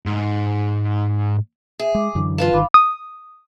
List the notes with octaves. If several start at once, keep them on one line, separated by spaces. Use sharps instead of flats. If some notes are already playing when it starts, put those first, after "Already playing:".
G#2
G#4 E5
G#3 D6
F#2 D3 E3
F4 B4 F5 A5
G1 D#3 F5 B5 D6
D#6